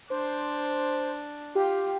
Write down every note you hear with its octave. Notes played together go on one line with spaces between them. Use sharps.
D4 C5
F4 G4